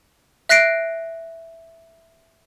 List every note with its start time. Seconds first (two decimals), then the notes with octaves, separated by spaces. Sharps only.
0.49 E5 F#6 A#6 C7 D7